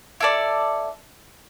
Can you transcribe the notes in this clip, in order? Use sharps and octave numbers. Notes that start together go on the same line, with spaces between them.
E4 A4 D5